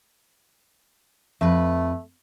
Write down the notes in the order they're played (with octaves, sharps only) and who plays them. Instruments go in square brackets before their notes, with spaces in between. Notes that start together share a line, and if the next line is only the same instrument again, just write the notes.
[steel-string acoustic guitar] F2 B4 [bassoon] A3